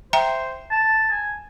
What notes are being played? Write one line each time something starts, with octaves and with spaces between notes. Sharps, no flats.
C5 E5 G5 A#5
A5
G#5